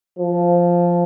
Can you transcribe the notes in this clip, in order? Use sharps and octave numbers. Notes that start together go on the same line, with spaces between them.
F3